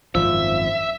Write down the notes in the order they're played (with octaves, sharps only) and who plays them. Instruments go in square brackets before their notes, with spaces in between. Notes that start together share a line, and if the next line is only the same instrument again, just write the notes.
[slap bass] G#1 F#2 [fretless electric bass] F3 [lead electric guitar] E5